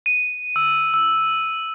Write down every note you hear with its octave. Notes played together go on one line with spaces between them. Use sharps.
D#7
E6
E6